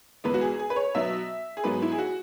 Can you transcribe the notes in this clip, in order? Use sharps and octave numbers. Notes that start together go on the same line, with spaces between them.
E2 E3 G#3 B3 B4
F#4
G#4
G#4
B4
C#5
B2 F#3 B3 E5
G#4
G#2 F#3 B3 B4
E4
G#4
F#4